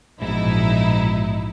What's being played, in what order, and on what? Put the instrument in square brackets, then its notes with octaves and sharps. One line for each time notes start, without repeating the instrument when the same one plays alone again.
[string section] A#1 D#4 E4 [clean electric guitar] G#2 B2 E3